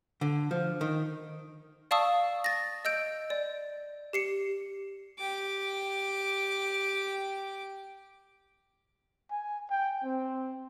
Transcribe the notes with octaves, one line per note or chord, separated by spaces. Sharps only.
D3
F3
D#3
D5 F5 A5 C#6 D#6 E6
A6 A#6
D#5 E6 G6 D7
D5
G4 C7 C#7
G4 D6
G#5
G5
C4